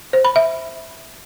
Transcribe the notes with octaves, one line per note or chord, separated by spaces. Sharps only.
C5
B5
E5